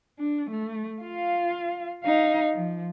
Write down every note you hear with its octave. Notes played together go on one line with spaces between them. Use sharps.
D4
A3
F4 F5
D#4 F5
F3